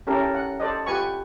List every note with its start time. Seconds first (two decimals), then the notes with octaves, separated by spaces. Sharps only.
0.07 C#4 E4 G4 A4 A#4
0.35 F#5
0.60 A4 C5 D5 D#5
0.86 F4 G4 B4 F#5 G#5 C#6